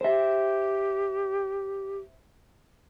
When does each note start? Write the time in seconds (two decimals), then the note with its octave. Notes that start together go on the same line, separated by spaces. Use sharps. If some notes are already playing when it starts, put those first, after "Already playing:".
0.01 G4 C5 E5